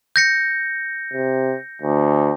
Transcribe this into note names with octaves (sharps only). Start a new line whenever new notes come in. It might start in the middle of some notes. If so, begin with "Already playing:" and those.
G6 A#6 C#7
C3
D2